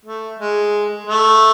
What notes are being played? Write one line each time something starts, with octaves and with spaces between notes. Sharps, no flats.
A3
G#3
A3